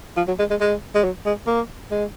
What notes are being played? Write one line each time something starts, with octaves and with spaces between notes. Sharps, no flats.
F3
F#3
G#3
G#3
G#3
G#3
F#3
G#3
A#3
G#3